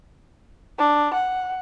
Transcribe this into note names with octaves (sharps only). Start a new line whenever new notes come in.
D4
F#5